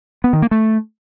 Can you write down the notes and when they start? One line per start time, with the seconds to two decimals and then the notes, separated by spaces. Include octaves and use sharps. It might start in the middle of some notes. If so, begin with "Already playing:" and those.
0.24 B3
0.33 D#3
0.42 A#3
0.51 A3